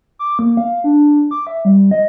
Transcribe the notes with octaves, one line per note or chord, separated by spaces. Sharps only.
D6
A#3
F5
D4
D6
E5
G3
D#5